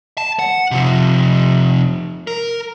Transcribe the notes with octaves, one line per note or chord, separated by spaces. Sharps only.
A5
F#5
C3 F3
A#4